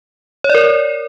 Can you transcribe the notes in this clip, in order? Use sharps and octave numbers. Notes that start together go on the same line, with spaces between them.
C#5
D5
A#4